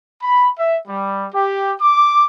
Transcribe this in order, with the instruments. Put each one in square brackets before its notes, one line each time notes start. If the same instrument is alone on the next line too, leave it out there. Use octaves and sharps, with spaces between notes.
[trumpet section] B5
E5
G3
G4
D6